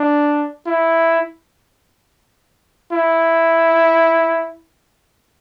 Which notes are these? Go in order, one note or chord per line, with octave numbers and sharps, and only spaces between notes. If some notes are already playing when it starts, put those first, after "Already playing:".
Already playing: D4
E4
E4